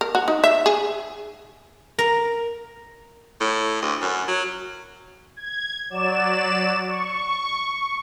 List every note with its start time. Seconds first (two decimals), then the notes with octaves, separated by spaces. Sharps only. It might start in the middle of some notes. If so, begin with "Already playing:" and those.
0.01 A#4
0.15 F#4
0.28 D#4
0.44 E5
0.66 G#4
1.99 A#4
3.41 A2
3.82 D2
4.02 F#2
4.28 F#3
5.36 G#6
5.90 F#3 D5 E7
6.88 C#6